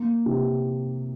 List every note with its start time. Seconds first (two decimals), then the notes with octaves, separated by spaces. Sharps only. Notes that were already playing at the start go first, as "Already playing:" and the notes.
Already playing: A#3
0.26 C3